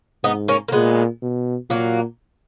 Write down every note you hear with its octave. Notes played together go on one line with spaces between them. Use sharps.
G#2 B3 D#4
A#3 C#4
A#3
A#2 G#3 B3
B2
A#2 F#3 A#3